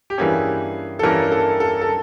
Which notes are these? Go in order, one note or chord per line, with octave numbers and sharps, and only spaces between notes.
G4
G2 E3 G3 A#3 C#4 G#4
A4
G2 E3 G3 A#3 C#4 A#4
A4
A4
A4